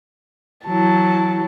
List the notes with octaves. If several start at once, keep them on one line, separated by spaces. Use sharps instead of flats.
E3 F#3 E4 A5